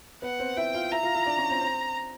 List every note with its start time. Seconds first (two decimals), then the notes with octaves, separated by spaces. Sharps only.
0.22 B3 B4 F#5
0.39 C4 C5
0.57 E4 E5 G5
0.74 F4 F5
0.91 E4 E5 A#5
1.03 F4 F5
1.14 E4 E5
1.26 D4 D5
1.38 C#4 C#5
1.50 C4 C5
1.61 C4 C5